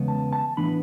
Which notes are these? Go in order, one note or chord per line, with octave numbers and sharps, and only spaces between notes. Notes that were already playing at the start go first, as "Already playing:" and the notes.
Already playing: E2 C#3 G#3 B3
A5
A5
A2 E3 B3 D4 B5